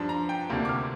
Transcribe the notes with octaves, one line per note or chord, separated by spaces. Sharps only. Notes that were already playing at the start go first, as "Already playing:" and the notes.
Already playing: G2 F3 D4 C6
A#5
G5
D2 C3 A#3 D4
D6
F6